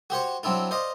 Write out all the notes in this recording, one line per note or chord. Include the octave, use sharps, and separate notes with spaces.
F#4 G4 C5 C#5
F#3 C4 D4 E4 F4
C5 D5 D#5 F5